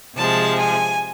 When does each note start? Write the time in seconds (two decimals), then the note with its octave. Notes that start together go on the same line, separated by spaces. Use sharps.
0.16 C3 F3 G#3 A5
0.57 G#5